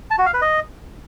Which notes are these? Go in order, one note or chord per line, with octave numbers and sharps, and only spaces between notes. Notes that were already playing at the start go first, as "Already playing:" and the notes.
A5
F#4
F5
B4
D#5